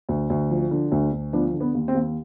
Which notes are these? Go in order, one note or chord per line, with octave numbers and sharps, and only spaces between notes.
D2
D2
F3
D3
D2
D2
F3 B3 D4
D3
B3
D#2
C4
D#2